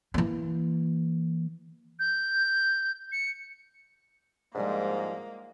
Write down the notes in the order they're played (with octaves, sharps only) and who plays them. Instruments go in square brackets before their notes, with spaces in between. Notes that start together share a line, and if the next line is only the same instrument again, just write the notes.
[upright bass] E3 A#3
[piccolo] G6
C#7
[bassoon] G#2 [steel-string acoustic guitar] F3 G3 D4 [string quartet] G#3 A#3